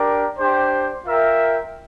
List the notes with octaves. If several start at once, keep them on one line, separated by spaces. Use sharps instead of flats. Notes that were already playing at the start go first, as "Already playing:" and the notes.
Already playing: D4 G4 A#4 D5
D4 G4 C5
F4 A#4 E5 G5